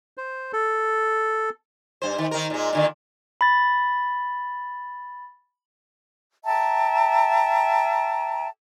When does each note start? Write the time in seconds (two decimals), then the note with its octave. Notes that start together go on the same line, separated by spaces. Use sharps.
0.17 C5
0.53 A4
2.02 G2 C5
2.18 D#3
2.31 D#3 A#4
2.50 A#2 G#3
2.73 A#2 D3 D#3
3.41 B5 A6
6.45 E5 G5 A5 A#5